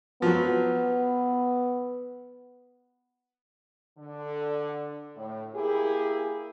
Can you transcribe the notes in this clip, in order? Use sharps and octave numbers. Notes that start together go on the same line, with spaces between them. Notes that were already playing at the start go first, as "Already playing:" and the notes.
F3 F#3 B3
D3
A2
A#3 E4 G4 G#4